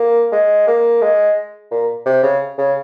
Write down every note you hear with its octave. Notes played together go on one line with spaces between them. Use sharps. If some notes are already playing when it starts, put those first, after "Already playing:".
Already playing: A#3
G#3
A#3
G#3
A#2
C3
C#3
C#3